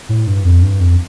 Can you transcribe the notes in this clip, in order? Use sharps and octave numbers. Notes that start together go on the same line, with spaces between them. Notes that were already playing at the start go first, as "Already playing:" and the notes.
A2
G2
F2
G2
F2